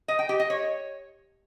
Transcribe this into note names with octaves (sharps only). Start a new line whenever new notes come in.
D#5
G5
G4
D#5
C#5